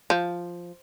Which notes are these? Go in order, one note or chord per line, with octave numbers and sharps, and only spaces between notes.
F3